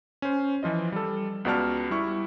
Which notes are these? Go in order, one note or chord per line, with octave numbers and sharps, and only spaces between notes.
C#4 C5
E3 F3 F4 D#5
G3 A4
C#2 B3 F#4 D5 A5 F6
G3 E4 C#6